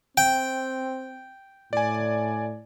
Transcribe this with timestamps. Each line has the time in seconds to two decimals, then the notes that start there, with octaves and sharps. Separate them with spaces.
0.17 C4 G5
1.73 A2 D5 G#5